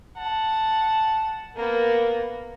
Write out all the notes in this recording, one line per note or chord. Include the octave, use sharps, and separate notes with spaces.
F#5 A5
A#3 B3 A#4